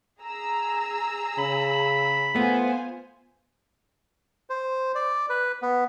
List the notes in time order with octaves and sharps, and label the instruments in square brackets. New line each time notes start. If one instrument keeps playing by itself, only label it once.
[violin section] G#4 A#5 E6
[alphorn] C#3 [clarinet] B5
[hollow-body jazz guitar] A3 B3 [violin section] F4 C5 G#5
[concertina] C5
D5
B4
B3